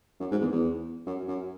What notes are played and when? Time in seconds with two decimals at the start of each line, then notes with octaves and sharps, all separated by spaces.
0.20 F#2
0.31 G#2
0.41 E2
0.52 E2
1.07 F#2
1.28 F#2